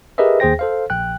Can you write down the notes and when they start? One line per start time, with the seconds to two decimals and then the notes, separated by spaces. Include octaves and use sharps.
0.18 G4 G#4 A#4 B4 D#5 E5
0.40 D#2 G#4 C5 G5 A#6
0.59 A4 C5 F5
0.90 A#1 G5 F#6